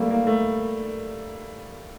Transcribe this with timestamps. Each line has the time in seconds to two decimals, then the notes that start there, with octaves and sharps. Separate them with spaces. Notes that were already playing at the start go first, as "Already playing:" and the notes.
Already playing: G3 A3 A#3
0.10 A#3
0.27 A3